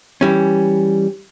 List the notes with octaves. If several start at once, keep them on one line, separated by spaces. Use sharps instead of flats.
E3 G3 C#4